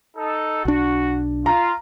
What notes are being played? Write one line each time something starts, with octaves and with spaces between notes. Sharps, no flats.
D#4 A4
B1 D4 F#4
F4 A#5